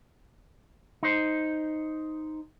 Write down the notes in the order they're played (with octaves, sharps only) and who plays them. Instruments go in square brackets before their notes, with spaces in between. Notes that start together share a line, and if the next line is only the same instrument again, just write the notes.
[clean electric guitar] D#4 C5